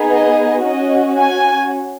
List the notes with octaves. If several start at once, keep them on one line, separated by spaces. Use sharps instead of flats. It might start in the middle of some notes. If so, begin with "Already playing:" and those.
Already playing: B3 D#4 G#4
D#5
C#4 F#4 D#5
G#5